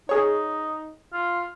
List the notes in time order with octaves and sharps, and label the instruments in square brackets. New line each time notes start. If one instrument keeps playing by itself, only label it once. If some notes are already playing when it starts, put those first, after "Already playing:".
[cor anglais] D#4 [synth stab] G#4 C#5
[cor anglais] F4